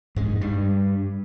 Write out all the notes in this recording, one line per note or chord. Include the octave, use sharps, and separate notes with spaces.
G#2 G#3
G2 G3